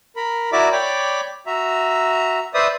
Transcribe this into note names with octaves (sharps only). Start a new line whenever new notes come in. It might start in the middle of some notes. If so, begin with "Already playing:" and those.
A#4 B5
E4 F#4 A#4 D5 E5 D6
C#5 D5 G5 B5 D6
F#4 E5 A#5
B4 C5 D5 E5 D#6